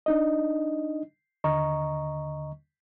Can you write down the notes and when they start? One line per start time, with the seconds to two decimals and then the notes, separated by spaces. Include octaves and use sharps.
0.06 D4 D#4 D#5
1.44 D#2 D3 D#5 A#5 C#6